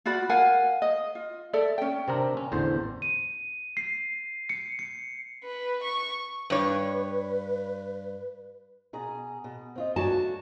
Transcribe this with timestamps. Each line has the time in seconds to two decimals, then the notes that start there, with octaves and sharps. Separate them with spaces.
0.06 F4 F#4 D5 B5
0.29 A#4 F5 F#5 G#5
0.82 D#5
1.15 F4
1.53 A4 D5 E5
1.78 C#4 G5
2.08 C3 C4 D4 A#4
2.37 C#4
2.52 A1 E2 D3 C5
3.02 D#7
3.77 C7
4.49 C#7
4.79 C#7
5.44 B4
5.83 C#6
6.50 G2 B4 C#5
8.93 B2 G#4 A#5
9.44 B2
9.76 C4 F4 D#5
9.96 D4 F#4 B4 C#5 A5
10.10 A3